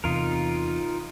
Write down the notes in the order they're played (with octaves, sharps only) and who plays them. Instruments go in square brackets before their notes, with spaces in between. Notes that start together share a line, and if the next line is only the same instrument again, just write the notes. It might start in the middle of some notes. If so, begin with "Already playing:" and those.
[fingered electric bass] E2 C3 [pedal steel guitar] D#4 F4 A#4